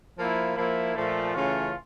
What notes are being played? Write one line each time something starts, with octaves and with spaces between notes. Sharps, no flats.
F3 A#3 E4
F3 A#3 E4
A#2 F3 A3
C#3 E3 A3 C#4 F4